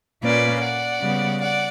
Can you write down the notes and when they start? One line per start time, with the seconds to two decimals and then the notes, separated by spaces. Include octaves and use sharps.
0.23 A#2 A#3 C#4 B4 D5
0.62 D5 F#5
1.01 C#3 G3 B3
1.40 D5 F#5